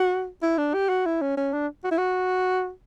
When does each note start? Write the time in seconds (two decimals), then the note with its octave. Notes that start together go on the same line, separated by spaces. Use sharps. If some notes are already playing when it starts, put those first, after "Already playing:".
Already playing: F#4
0.42 E4
0.58 D4
0.74 G4
0.89 F#4
1.05 E4
1.21 C#4
1.37 C#4
1.53 D4
1.84 F#4
1.91 E4
1.98 F#4